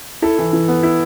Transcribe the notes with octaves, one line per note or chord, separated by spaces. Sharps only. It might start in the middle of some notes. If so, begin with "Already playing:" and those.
E4 A4
E3
E3
B3
E4